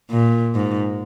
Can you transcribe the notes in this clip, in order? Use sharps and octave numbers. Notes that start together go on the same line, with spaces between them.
A#2
G#2